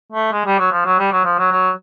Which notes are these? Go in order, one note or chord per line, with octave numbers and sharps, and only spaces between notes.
A3
G#3
G3
F#3
F3
F#3
G3
F#3
F3
F#3
F#3